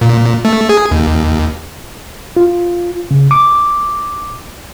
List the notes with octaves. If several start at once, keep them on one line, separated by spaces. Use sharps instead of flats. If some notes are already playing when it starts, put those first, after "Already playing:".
A#2
A3
G#4
D#2
F4
C#3
D6